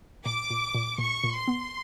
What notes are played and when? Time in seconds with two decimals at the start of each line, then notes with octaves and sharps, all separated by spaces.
0.25 A#2 D6
0.50 A#2
0.75 A#2
0.98 A#2 C#6
1.24 A#2
1.35 C6
1.48 B3